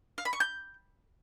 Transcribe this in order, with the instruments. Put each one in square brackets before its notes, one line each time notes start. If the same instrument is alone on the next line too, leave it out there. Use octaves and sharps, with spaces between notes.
[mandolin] F5
B5
C#6
G6